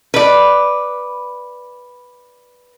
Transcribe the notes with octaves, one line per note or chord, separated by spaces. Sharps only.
B4 D5